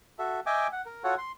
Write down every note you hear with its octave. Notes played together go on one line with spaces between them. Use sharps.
F#4 A4 E5
D#5 E5 G5 G#5 D6
F#5
A#4
F4 F#4 A4 C#5 F#5
C6